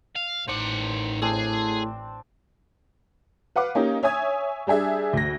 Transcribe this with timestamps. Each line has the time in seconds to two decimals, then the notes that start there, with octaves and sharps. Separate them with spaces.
0.15 F5
0.48 A1 D#3 C5 F#5 D6
1.22 A2 C4 D4 G#4 C5
3.56 B4 F5 F#5 D6
3.75 A#3 C#4 D#4 G4
4.03 C#5 E5 G#5 D#6 G#6
4.67 G3 D4 G#4 E5
5.13 D2 A#6